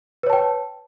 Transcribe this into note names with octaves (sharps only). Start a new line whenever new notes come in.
B4 C#5 G5 A5